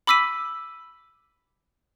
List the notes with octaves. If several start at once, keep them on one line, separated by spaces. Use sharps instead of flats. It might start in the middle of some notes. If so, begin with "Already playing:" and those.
B5 D6 E6 B6 D#7